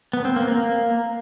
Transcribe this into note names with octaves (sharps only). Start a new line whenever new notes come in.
B3
C4
A#3
A#3